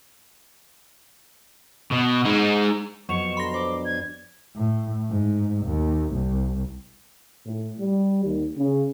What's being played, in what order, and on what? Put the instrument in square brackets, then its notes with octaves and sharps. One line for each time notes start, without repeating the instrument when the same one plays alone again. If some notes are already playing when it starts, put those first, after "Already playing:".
[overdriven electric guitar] B2
G#3 D#4
[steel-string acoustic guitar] F2 [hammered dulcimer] B2 [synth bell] F#3 E7 F7 [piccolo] C#6
[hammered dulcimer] D3 F#3 G3 [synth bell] B5 A#6 [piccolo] C6
[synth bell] C5 [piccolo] D6
[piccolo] G#6
[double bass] A2
G#2
D#2
C2
[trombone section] A2
G3
D#2
C#3